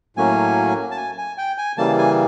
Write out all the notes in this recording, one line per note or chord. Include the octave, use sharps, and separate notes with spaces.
A2 F#3 A#3 C#4 G#5
A5
G#5
G#5
G5
G#5
C#3 E3 G3 A#3 A5
G#5